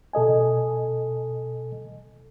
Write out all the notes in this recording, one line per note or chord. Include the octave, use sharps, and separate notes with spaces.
B2 A4 D#5 G#5